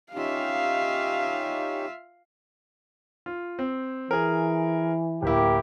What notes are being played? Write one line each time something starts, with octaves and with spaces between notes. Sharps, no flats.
C#4 D#4 F4 G4 E5 F5
F4
C4
E3 G#4 A#4
D1 A#3 E4 G4